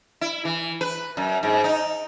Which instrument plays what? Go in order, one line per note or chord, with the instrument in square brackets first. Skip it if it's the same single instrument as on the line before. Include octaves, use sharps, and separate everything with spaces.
[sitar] E4
E3
B4
F#2
G#2
D#4